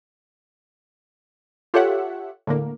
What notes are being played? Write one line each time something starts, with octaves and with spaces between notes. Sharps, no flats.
F4 G4 A4 C#5 E5 F#5
A2 D3 A#3